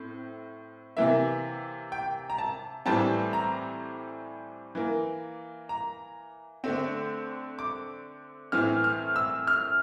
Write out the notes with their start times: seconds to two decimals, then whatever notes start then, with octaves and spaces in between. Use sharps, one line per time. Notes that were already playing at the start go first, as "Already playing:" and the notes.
Already playing: A2 C4
0.97 C3 E3 A#3 E5
1.92 G5
2.30 A#5
2.38 A5
2.86 A2 E3 G3 C4 A5
3.33 A#5
4.75 E3 A#3
5.69 A#5
6.64 D3 A3 C4
7.59 D6
8.52 A2 E3 A3 C4 F6
8.84 F6
9.16 E6
9.47 F6